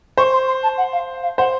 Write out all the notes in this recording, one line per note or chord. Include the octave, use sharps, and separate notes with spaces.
C5 C#6
C6
C6
A5
F#5
F5
F5
C5 F#5